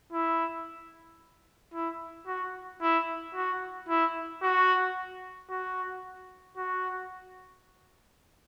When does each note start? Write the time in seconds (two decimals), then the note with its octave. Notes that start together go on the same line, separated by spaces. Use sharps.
0.13 E4
1.74 E4
2.27 F#4
2.82 E4
3.35 F#4
3.89 E4
4.42 F#4
5.50 F#4
6.57 F#4